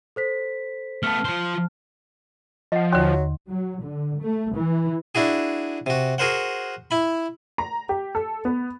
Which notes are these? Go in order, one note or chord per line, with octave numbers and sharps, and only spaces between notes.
A4 C5 B6
A3 B3 A5 F6
F3 C5
F3 D#5 F#5
D#2 D3 F#3 C6
F#3
D3
A3
E3
D4 E4 F#4 G#4
C3 F#4
F#4 G#4 A#4 C5 F#5
E4 B5
A#5
G4
A4
B3